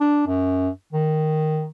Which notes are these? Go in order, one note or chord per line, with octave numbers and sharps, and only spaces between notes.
D4
F#2
D#3